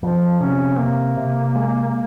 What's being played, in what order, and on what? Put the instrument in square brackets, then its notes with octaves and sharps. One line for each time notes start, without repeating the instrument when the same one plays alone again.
[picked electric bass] F2 [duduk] F3
[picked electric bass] C3 [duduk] C#4
[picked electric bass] C3 [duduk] A#3
[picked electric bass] C3
G#3